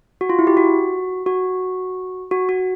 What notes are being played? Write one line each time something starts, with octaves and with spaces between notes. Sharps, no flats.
F#4
F4
E4
G4
F#4
F#4
F#4
F#4